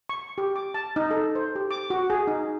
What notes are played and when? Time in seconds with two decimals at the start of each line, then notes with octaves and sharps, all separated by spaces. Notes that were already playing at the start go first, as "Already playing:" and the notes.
0.09 C#6
0.38 G4
0.56 D6
0.74 A5
0.96 D#4
1.11 A4
1.35 C5
1.55 G4
1.71 D6
1.90 F#4
2.10 G#4
2.27 D#4